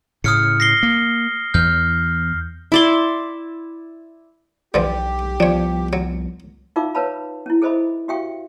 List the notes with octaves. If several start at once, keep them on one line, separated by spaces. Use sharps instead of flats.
A2 C#3 D#6 F6 C#7
A#6 C7 G7
A#3
E2 F6 G6
E4 D5 C6
B1 D3 E3 F3 G4
C2 F3 B3 D4 C#5
F#3
D#4 F4 A#4 E5 F5 D6
A#4 B4 C#5 F5 A5 B5
C#4 E4
G#4 A4 C5 D#5 E5 B5
F#4 G4 E5 F5 G5 C#6